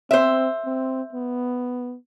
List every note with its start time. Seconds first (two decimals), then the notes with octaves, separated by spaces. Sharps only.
0.11 C4 C5 E5
0.65 C4
1.13 B3